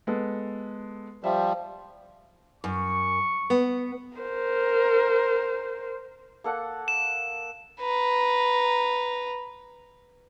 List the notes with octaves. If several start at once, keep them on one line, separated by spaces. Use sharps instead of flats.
G#3 B3 A4
F3 G3 E5
F#2 C#6
B3
A#4 C5
A#3 A4 F#5
E7
B4 A#5